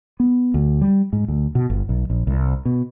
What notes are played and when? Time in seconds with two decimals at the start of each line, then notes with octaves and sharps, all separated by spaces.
0.20 B3
0.54 D2
0.82 G3
1.13 G#2
1.28 D2
1.55 B2
1.70 G1
1.89 B1
2.10 A#1
2.27 C2
2.65 B2